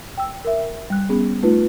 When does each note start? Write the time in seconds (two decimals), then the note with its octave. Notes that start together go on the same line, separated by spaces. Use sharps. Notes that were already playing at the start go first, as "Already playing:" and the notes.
0.18 G5 E6
0.45 A#4 E5
0.90 G3 F#6
1.09 B3 C#4 G#4
1.43 A3 D#4 F4 B4